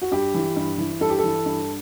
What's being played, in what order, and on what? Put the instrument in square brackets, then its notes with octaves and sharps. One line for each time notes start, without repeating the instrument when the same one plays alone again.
[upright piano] F#4
G2 G4
E3
G2
E3
G2 A4
G4
E3 A4
G2